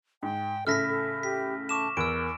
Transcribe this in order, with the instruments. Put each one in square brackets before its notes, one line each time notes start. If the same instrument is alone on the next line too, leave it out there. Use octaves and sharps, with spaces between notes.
[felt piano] G#2 [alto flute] G5
[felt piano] A2 C#3 E5 [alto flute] A4 [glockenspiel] F6 A#6 B6
[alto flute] A4
[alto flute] G4 [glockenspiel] B6
[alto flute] A5 [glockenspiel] C#6 D6 E7
[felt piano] E2 [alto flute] A#4 [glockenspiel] E6 D7